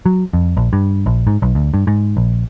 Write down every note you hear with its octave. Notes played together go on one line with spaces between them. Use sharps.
F#3
F2
A#1
G2
A#1
G#2
B1
D2
G2
G#2
A#1